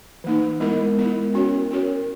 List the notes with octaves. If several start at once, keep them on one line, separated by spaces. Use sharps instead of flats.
E3 A#3 D#4
G#3 B3 E4 A#4
G#3 B3 E4 A#4
C#4 F#4 A#4 C#5
C#4 F#4 A#4 C#5